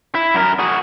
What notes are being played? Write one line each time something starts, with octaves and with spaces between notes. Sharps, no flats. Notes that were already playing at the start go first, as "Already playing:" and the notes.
E4
F#2 A#4
F#4 G#4